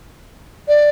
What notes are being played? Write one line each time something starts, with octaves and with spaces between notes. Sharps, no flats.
D5